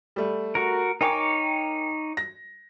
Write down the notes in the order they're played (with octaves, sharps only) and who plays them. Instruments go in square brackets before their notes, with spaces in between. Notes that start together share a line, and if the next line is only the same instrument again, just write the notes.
[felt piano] G3 A3
[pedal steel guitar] F#4 A#4
[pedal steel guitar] D#4 C#5 D6 [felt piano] A#4 G5 G#5
[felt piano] A#6